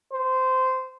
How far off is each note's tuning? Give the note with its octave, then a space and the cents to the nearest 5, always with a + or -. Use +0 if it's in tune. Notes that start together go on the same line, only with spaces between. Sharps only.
C5 -15